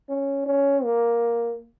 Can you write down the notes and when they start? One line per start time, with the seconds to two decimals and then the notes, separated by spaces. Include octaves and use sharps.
0.09 C#4
0.46 C#4
0.84 A#3